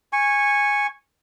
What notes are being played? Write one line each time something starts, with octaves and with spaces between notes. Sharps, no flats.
G#5 C#6